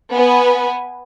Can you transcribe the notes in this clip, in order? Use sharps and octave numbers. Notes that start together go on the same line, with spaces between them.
B3 B4 G#5